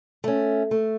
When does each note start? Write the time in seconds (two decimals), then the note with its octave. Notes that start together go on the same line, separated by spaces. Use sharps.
0.24 A3 C#4
0.71 A3